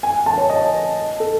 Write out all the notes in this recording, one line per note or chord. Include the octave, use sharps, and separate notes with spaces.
G#5
A5
C#5
D#5
A4